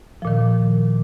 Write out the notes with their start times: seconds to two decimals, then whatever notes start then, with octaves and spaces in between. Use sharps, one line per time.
0.22 F3
0.25 A#2
0.27 D#3